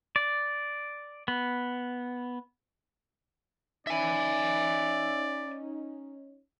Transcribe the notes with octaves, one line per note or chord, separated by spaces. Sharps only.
D5
B3
C#4 D#4 D5 E5 G#5